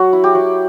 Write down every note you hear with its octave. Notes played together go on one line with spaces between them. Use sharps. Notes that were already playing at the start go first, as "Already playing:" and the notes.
Already playing: F#3 F#4
E4
G4
F#3